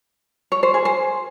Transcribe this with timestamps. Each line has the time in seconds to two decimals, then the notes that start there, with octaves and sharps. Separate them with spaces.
0.52 C#5
0.63 C5
0.74 G#4
0.85 C5